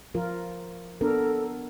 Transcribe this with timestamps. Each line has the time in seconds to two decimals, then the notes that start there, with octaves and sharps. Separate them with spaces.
0.15 F3 F4 A#4
1.01 B3 D4 A4 A#4